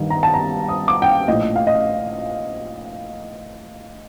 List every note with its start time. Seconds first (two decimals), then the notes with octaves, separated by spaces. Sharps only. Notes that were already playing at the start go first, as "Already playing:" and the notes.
Already playing: G1 G2 D#3
0.10 A#5
0.23 A5
0.34 A#5
0.68 D#6
0.88 D6
1.02 G5
1.08 F5
1.28 A#1 A2 F3 D#5
1.56 F5
1.67 D#5